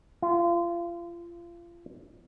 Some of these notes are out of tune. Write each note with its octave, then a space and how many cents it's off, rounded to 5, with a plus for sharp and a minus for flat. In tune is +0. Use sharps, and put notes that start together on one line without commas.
F4 -30